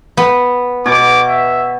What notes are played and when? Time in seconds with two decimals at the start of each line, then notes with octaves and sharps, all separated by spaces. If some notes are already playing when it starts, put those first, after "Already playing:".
0.17 B3
0.86 B2 G#5 C#6 D6
1.28 E5